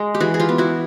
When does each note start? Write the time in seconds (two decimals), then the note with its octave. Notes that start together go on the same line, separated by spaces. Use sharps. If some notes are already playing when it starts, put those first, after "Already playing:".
Already playing: G#3
0.15 G4
0.20 E3 F#4 G#4
0.34 G#4
0.40 F4 G4
0.49 B3
0.58 E4 F#4